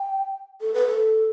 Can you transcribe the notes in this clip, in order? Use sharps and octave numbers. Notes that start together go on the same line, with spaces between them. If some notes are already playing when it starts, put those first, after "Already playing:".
Already playing: G5
A4
B4
A4